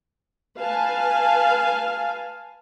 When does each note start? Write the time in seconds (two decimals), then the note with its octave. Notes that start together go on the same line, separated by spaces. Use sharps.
0.59 B4 F5 G#5 A5